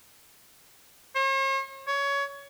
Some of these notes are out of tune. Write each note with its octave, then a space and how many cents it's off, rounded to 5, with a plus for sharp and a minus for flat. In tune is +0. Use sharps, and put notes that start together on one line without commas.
C#5 -45
C#5 +20